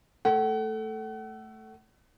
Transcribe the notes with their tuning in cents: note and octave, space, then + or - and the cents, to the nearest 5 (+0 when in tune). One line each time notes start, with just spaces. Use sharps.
A3 +0 F#5 +35